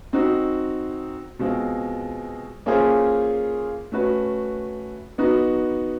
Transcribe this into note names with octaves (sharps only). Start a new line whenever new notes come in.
C4 D#4 F#4
B2 G#3 C4 F4
A#3 C#4 F4 G#4 C5
A3 C#4 F#4 B4
B3 D#4 F#4